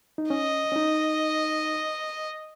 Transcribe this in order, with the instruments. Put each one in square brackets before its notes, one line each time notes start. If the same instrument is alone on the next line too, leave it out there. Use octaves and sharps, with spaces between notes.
[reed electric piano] D#4
[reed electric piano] C#4 [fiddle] D#5
[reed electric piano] C#4
D#4